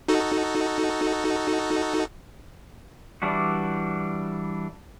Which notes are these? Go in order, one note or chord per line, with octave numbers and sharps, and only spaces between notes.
D#4 F#4 A4
E3 G3 D4 E4 F#4